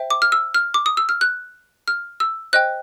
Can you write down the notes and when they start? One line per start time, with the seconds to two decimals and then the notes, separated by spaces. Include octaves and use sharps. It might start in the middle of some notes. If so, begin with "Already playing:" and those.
Already playing: C5 E5 G5
0.10 D6
0.22 F6
0.32 E6
0.54 F6
0.74 D6
0.86 D#6
0.97 E6
1.09 F6
1.21 F#6
1.88 F6
2.20 E6
2.53 C5 D#5 G5 F#6